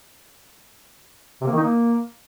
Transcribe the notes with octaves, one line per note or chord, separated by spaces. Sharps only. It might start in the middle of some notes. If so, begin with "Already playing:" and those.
C3
A#3
D#3
D#4
A#3